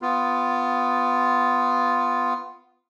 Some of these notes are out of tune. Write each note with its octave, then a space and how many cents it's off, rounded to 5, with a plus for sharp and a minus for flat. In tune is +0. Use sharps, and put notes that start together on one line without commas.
B3 +15 F4 +0